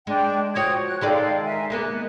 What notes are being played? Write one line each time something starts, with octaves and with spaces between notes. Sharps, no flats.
G#3 D4 G5
F3 F#4 C#5 G5 D#6 G#6
F#6
D#3 G#3 A4 D5 F5 G5
A#4 E5 G#5
G#3 A#3 B3 F#6